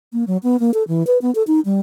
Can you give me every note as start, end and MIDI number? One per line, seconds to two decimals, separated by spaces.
0.13 0.24 58
0.27 0.37 54
0.43 0.59 59
0.60 0.73 58
0.74 0.83 69
0.88 1.05 52
1.07 1.18 71
1.22 1.33 59
1.35 1.43 69
1.47 1.60 63
1.65 1.80 55